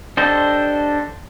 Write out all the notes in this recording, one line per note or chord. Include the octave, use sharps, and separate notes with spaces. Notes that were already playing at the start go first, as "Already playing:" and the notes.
D4 G4 A4 C5 D#5